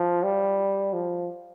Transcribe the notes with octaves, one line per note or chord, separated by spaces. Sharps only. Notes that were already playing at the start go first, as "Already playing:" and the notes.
Already playing: F3
G3
F3